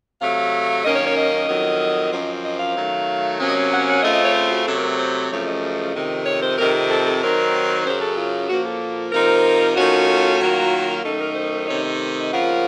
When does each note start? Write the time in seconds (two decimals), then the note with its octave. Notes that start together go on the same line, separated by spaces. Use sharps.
0.20 C3 F#3 A3 F5
0.84 F#2 D#3 A#3 C#4 D#5
0.95 C#5
1.06 C#5
1.17 D#5
1.48 F2 D#3 F#3
2.12 F#2 F3 C4
2.43 D#5
2.60 F5
2.75 D#3 F#3 A3
3.39 C3 F#3 A#3 C#4
3.49 D#5
3.55 F5
3.71 F#5
3.87 F#5
4.03 C#3 A3 C4 F4 D#5
4.13 D#5
4.24 C#5
4.35 C5
4.51 F#4
4.67 C3 F#3 A3 A4
4.77 A#4
4.88 A#4
4.98 C5
5.30 F#2 C#3 F3 A3 C#5
5.46 D#5
5.94 F2 C3 D#3
6.26 C#5
6.42 C5
6.57 F2 C3 D#3 A#4
6.89 A4
7.05 A4
7.21 D#3 F#3 C4 D#4 A#4
7.85 F#2 C#3 F#3 C5
8.01 A4
8.16 F4
8.48 A#2 F3 A#3 F#4
8.65 A4
9.12 C3 F3 C4 D#4 A#4
9.76 D#3 A3 C#4 F4 F#4
10.40 D#3 F#3 A#3 F4
11.03 F#2 D#3 A3 D#4 A4
11.19 A#4
11.35 C5
11.51 C5
11.67 C3 D#3 A3 D#4 C#5
11.83 D#5
12.31 C#3 F3 A#3 F4 F#5